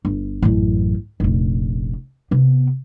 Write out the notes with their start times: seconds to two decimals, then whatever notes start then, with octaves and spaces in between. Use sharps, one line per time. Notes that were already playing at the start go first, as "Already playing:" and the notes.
0.05 G1
0.42 A1 F#2
1.20 F1 A#1
2.31 C3 B3